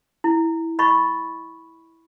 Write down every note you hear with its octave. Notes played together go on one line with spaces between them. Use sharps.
E4
D#5 B5 C#6